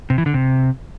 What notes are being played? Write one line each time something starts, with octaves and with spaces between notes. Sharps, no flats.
C3
E3
D3
C3